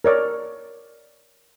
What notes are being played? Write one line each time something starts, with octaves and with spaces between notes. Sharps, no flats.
A#4 C#5 D5